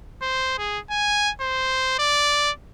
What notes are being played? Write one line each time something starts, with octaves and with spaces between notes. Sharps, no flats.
C5
G#4
G#5
C5
D5